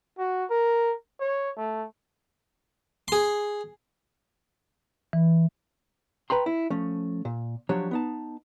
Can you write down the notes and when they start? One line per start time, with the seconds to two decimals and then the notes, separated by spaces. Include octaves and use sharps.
0.19 F#4
0.50 A#4
1.20 C#5
1.57 A3
3.08 G#4 C6
5.13 E3
6.30 B4 G5 A#5 C6
6.46 E4
6.70 F3 A3 C#4
7.25 A#2
7.69 F3 F#3 D4 G4 C#5
7.91 B3 D#4 A5